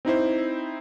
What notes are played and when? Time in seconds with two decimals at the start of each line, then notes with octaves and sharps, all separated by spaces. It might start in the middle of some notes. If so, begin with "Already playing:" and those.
0.05 C4 D#4 E4 C5